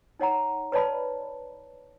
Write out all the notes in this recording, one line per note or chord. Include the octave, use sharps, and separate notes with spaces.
D#4 C#5 F#5 A#5
B4 C#5 D5 A5 B5